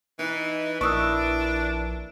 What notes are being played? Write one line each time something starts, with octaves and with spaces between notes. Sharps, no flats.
E3 D#4
A#1 D4 E4 A#4 B4 C#6 D#6 E6